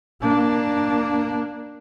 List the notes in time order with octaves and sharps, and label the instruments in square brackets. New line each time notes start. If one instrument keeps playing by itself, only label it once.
[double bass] A#3 D4